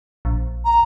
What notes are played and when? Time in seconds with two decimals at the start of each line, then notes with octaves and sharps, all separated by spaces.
0.25 A#1
0.65 A#5